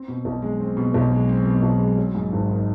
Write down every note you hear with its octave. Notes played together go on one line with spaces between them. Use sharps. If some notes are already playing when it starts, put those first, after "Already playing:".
Already playing: C4
B2
B1
G#3
C4
B2
B1
G#3
C4
B2
B1
G#3
F#3
G#2
G#1
D#3